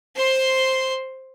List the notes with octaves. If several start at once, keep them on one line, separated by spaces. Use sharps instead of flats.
C5 C6